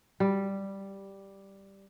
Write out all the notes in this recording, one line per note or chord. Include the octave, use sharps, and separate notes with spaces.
G3